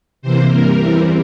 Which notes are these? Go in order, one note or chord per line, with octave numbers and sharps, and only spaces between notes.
C3 E3 A#3 C5
G2 E3 G3 A#4
E2 E3 G3 C4